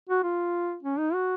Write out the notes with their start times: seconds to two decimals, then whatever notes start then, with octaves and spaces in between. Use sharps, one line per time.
0.09 F#4
0.23 F4
0.83 C#4
0.99 D#4
1.14 F#4